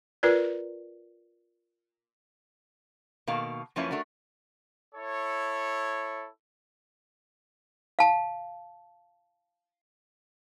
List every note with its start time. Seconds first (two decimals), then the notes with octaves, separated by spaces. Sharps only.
0.23 F4 A#4 B4 D5
3.27 B2 D#3 A#3 F5 A5
3.76 F#2 F3 A#3 C#4 E4 B4
3.91 A3 D4 F#4 A#4
4.94 E4 A4 C#5
7.99 F5 A5